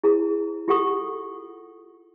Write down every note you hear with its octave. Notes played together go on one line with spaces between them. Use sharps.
E4 G#4 C5 A#5
F4 G4 A4 F#5 C#6 D#6